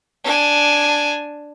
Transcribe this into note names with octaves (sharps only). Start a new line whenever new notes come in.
D4 G#5